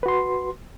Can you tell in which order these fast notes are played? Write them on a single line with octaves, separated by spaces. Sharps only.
B4 F#4 C6